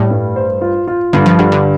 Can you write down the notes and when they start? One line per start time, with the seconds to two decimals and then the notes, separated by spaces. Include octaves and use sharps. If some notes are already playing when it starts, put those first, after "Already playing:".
Already playing: A2 G3
0.10 G2
0.36 C5
0.62 F4
0.87 F4
1.13 G2 D3
1.26 F3
1.39 D3 G3
1.52 D3